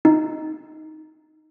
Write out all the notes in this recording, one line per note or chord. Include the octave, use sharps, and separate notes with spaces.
D#4